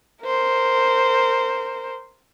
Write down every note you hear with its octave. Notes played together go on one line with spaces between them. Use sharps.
A#4 C5